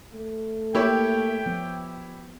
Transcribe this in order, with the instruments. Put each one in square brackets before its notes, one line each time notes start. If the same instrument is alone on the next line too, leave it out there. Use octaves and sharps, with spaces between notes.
[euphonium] A3
[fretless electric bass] A#3 [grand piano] E4 G4 C#5 [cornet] G5
[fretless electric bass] F3 B3